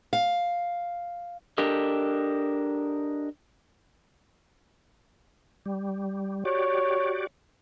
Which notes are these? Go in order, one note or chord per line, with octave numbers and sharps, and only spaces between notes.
F5
D4 G4 A4 A#4 D#5
G3
F#4 G4 C#5 D5